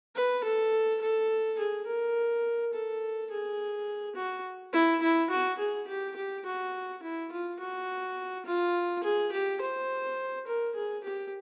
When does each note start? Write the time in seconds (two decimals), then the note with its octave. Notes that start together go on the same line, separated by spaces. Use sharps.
0.15 B4
0.44 A4
1.01 A4
1.58 G#4
1.86 A#4
2.73 A4
3.31 G#4
4.15 F#4
4.73 E4
5.02 E4
5.30 F#4
5.59 G#4
5.87 G4
6.16 G4
6.45 F#4
7.03 E4
7.31 F4
7.59 F#4
8.46 F4
9.03 G#4
9.32 G4
9.61 C5
10.47 A#4
10.75 G#4
11.04 G4